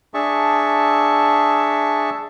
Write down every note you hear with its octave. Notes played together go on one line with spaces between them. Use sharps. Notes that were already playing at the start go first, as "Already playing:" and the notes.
D4 G#4 E5 A5 C#6